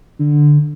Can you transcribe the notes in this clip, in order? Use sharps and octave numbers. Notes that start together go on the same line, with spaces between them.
D3